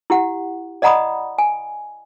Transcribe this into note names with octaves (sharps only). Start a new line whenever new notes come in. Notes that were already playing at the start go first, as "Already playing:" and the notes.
E4 G4 F#5
D5 D#5 F#5 A#5 B5 D#6
G#5